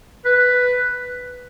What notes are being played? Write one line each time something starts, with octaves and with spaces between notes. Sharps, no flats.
B4